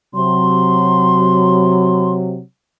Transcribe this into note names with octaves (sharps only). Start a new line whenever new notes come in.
C3 F#3 C6